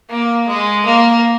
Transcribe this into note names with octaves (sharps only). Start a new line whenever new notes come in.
A#3
G#3
A#3